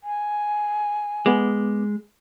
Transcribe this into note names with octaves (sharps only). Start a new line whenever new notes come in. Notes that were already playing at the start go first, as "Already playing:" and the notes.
G#5
G#3 B3 D6